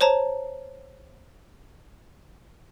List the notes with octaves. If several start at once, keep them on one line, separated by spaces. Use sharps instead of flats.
C5 C#5 A5 A#5